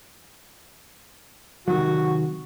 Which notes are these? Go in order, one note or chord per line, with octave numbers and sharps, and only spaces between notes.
C3 D#3 F#3 F#4